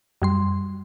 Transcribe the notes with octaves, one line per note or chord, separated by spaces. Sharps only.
F#2 G3 C6